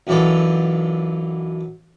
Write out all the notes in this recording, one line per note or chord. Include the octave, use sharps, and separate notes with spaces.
B1 F#2 E3 D4 F4 A4